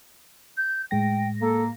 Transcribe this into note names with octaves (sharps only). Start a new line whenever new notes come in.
G6
A2 G#3 G5 A#6
A#3 A4